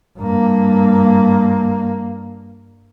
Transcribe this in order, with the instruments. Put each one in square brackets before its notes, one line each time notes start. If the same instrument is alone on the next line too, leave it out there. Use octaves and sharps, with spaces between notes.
[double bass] G2 A#3